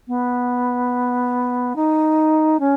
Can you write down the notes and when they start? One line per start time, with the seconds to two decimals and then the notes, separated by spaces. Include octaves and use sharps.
0.08 B3
1.76 D#4
2.60 C#4